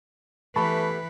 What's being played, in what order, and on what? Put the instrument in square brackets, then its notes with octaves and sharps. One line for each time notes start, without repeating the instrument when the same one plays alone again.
[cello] E3 B4 [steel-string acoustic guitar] A3 B3 G4 [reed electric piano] A5 B5 C#6